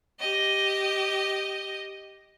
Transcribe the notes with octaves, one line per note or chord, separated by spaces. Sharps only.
G4 D#5